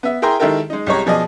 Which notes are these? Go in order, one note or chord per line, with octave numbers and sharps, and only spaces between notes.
B3 E5
E4 G#4 A#4 G5 A#5 C6
D#3 G#3 E4 G4 A4 A#4
G#3 D#4
C2 G3 G#3 C#5 A#5
B2 F3 G#4 D5 D#5